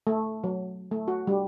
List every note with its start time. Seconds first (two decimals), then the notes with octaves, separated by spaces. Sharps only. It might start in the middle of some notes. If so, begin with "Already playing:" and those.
0.07 A3
0.44 F#3
0.91 A3
1.08 F#4
1.27 G3